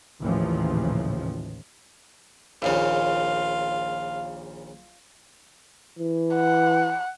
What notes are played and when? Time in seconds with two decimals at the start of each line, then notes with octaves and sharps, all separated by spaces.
0.20 A1 D#2 A#2 C#3 E3 F3
2.62 A#1 D#2 C#3 F4 F5
5.99 E3
6.35 F#5